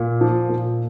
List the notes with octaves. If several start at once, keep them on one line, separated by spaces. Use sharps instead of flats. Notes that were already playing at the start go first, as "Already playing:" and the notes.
Already playing: A#2
F3
A#2